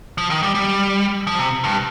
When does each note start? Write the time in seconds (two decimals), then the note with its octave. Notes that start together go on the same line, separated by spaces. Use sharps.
0.18 F3
0.30 D#3
0.43 G3
0.55 G3
1.27 F3
1.39 C3
1.64 G2